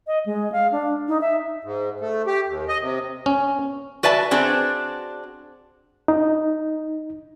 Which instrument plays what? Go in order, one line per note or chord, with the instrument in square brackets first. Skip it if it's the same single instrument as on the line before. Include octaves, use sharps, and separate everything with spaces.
[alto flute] D#5
G#3
F5
D4
D#4
E5
[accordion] G#2
A3
G4
D#2
D#5
C3
[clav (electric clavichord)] C#4
[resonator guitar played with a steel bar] F#4 B4 D5 E5 A5
C4 D4 F#4 G#4
[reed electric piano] D#4